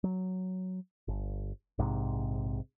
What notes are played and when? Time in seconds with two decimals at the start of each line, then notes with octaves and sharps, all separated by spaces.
0.04 F#3
1.08 G1
1.78 A#1 G#2 C3